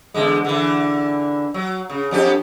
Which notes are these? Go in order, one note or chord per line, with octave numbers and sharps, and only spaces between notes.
E2 D3 G#3
D3 E3
F#3
C#3
F2 D4 G4